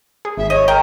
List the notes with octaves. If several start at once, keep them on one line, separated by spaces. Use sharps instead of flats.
G#4
G#1 E5
C#5 D#5
A#4 G5 A#5